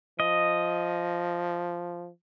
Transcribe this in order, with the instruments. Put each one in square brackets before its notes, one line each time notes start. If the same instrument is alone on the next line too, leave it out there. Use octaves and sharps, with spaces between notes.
[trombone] F3 [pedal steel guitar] D#5